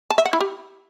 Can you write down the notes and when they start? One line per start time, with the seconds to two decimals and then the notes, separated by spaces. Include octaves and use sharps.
0.10 A5
0.18 E5
0.25 F#5
0.33 E4
0.40 G4